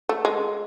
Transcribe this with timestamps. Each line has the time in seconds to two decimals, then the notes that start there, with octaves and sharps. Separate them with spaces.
0.09 A3
0.25 G#3